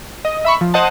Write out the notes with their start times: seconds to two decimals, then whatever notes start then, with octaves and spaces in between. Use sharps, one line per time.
0.25 D#5
0.45 E5 B5 C#6
0.61 F3
0.74 C5 D#5 F#5 A5